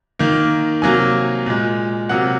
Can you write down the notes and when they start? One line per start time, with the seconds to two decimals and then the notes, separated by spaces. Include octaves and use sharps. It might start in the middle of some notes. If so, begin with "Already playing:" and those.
0.19 D#3 A#3
0.82 C3 F#3 A#3 G#5
1.46 A#2 G#3
2.09 C3 F#3 A#3 F#5